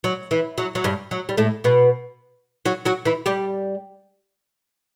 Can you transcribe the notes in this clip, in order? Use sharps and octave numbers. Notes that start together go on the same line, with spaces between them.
F#3
E3
F#3
F#3
G2 G3
F#3
G3
A2 A3
B2 B3
F#3 F#4
F#3 F#4
E3 E4
G3 G4